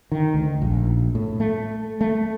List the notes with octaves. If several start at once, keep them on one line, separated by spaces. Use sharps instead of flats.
D#3
D2
A#1
A2
A3
A3